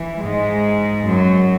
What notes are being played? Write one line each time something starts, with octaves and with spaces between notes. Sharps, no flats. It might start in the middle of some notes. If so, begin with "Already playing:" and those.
Already playing: E3
G#2 G#3
F#2 F#3